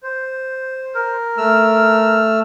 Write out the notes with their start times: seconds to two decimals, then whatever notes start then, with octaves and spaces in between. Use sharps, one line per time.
0.03 C5
0.94 A#4
1.38 A3 E6 F6